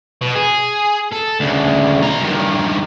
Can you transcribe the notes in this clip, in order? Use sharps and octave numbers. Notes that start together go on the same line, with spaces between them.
B2
G#4
A4
D2 C#3
B2 A#5
G2 D#3